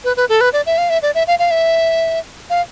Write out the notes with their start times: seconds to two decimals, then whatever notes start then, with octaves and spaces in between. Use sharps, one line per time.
0.04 B4
0.17 B4
0.29 A4
0.41 B4
0.53 D5
0.66 E5
0.78 F5
0.90 E5
1.02 D5
1.15 E5
1.27 F5
1.39 F5
1.51 E5
2.50 F5